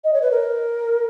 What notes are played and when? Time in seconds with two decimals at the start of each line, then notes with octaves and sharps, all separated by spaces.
0.04 D#5
0.14 C#5
0.22 B4
0.31 A#4